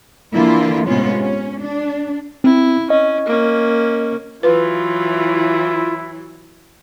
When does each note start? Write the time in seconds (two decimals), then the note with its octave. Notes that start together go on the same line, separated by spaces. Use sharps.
0.33 D3 E3 A#3 E4 F4
0.87 A2 C3 G#3 B3 C#4 F4
1.22 C#4
1.61 D4
2.44 C4 E4
2.90 C#4 D#5
3.26 A#3 C#4
4.43 E3 F#3 E4 F4 B4